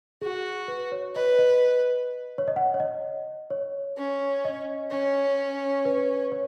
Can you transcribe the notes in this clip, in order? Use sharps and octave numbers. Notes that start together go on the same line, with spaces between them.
F#4 G#4
B4
C#5
B4 D#5
D#5
C#5
D#5
F#5
C#5
D#5
C#5
C#4
D#5
C#4 C#5
B4
C#5